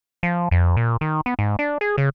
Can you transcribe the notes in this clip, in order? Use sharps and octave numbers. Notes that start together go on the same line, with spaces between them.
F3
F2
A#2
D#3
B3
G#2
D4
G#4
C#3